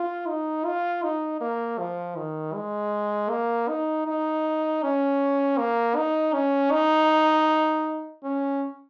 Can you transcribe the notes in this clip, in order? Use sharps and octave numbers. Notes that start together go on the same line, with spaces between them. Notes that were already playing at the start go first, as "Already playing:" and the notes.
Already playing: F4
D#4
F4
D#4
A#3
F3
D#3
G#3
A#3
D#4
D#4
C#4
A#3
D#4
C#4
D#4
C#4